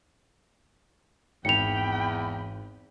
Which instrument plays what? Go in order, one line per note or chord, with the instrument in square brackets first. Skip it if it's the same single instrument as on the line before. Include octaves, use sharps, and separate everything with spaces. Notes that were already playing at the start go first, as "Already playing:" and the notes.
[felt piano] G#1 [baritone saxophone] E2 [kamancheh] G5 B5 [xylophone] C#7 F7